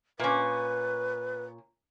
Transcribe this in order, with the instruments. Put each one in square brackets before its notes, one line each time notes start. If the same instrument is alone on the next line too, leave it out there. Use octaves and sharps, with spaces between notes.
[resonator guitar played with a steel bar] A#2 C#4 [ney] B4